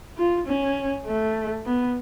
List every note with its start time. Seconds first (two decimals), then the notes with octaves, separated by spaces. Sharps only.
0.18 F4
0.47 C#4
1.06 A3
1.66 B3